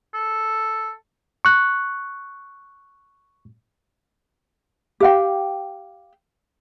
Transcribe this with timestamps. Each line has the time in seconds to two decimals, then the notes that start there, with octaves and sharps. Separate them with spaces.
0.14 A4
1.45 C#6 F#6
5.00 G4 F5 G5